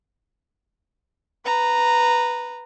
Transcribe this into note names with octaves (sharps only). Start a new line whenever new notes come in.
B4 A#5